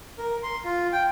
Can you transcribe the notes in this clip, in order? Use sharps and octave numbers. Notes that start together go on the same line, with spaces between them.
A#4
C6
F4
G5